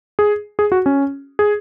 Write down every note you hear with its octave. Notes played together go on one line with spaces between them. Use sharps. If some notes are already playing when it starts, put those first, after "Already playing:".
G#4
G#4
F#4
C#4
G#4